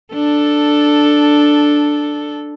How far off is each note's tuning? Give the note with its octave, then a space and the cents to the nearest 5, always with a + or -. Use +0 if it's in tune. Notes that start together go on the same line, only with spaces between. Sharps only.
D4 +5 A4 +0